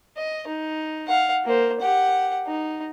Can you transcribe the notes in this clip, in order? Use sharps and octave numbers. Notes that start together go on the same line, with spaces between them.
D#5
D#4
F5 F#5
A#3 C5
G4 F#5
D#4